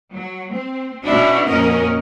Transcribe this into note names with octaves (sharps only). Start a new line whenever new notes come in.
F#3
C4
B2 C#4 D4 E4 F#4
F2 A#2 C#4 F#4 A#4 D#5